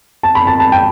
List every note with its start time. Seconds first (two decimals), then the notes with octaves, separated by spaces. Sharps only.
0.23 A5
0.35 B5
0.47 A5
0.60 A5
0.72 G5